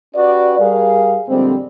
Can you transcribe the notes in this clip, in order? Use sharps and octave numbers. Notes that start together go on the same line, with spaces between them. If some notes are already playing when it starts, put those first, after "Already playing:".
C#4 F#4 G4 B4 D5
G3 G#4 A#4 F5
F2 A#2 D3 G3 G#3 C4